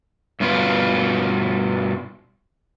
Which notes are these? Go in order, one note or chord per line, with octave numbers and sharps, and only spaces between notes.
G2 B2 B3 F4